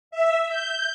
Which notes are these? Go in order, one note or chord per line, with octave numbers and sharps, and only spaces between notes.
E5
G6